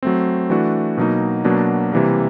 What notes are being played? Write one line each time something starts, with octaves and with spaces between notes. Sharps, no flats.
F#3 A3 C4
E3 A3 D4 F#4
B2 F#3 A#3 D#4
B2 F#3 A#3 D4 F#4
C3 E3 G3 A#3